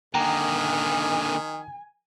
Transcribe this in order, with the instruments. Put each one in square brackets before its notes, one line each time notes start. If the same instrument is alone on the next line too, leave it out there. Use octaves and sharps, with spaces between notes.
[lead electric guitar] D3 A#3 [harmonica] D#3 [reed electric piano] G5 A#5 [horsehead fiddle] G#5